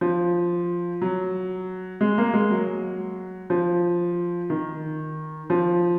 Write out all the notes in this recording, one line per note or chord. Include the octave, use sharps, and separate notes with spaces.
F3
F#3
G#3
A#3
G#3
F#3
F3
D#3
F3